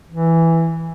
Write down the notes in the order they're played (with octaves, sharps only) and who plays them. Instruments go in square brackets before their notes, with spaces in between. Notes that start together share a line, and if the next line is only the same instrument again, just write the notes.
[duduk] E3